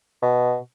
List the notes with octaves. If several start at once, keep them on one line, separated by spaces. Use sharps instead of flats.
B2